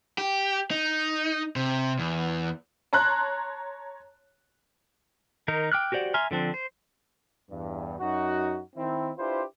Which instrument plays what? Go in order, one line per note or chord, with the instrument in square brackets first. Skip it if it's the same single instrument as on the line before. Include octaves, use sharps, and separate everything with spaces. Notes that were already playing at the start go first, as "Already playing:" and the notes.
[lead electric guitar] G4
D#4
C3
E2
[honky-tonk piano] C#5 A5 A#5 C6 F#6
[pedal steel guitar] D#3 D#4 A#4
G5 D6 F6 F#6
F#4 G4 C5 D5 F#5
E5 G#5 A#5 C6 F6
D3 F3 C4 D4
C5
[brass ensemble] E2 G2
F#2 D#4 F#4
D#3 C4 E4
D4 E4 F4 G4 B4 C5